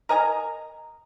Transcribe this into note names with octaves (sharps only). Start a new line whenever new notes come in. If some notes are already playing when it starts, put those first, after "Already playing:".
A#4 D#5 G#5 A#5